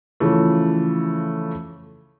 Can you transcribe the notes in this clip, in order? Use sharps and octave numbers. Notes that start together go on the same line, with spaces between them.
C#3 E3 F3 A3